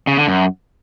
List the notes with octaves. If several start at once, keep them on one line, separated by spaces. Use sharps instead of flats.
C#3
D3
F#2